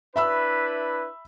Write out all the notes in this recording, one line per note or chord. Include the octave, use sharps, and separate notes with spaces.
D4 E4 B4 E5 B5 E6